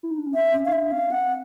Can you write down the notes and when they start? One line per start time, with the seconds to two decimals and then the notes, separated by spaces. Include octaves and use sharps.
0.03 E4
0.11 D#4
0.18 D4
0.27 C#4
0.34 C4 E5
0.53 C#4
0.65 D#4 F5
0.72 D4 E5
0.91 C4 F5
1.11 C4 F#5